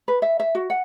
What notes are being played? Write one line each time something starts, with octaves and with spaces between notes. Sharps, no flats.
B4
E5
E5
F#4
F#5